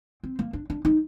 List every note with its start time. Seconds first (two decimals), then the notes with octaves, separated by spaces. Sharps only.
0.23 C4
0.39 A#3
0.53 D4
0.70 D4
0.85 D#4